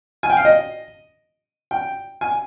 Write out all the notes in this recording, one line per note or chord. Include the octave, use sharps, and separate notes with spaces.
G#5
G5
F5
D#5
G5
G#5